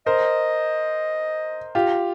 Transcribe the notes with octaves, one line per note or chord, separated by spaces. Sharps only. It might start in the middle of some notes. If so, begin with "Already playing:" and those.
A#4 C5 D#5
F4 G4